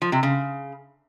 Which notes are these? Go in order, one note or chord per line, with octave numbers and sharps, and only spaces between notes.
F3
C3
C#3